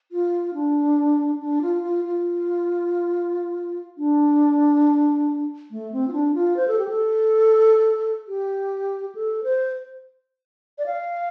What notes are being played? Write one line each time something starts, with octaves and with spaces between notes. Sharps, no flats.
F4
D4
D4
F4
F4
F4
D4
A3
C4
F4
D4
F4
C5
A4
G4
A4
G4
A4
C5
D5
F5